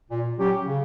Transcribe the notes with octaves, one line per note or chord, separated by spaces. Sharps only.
A#2
F#3 C#4 G4
C#3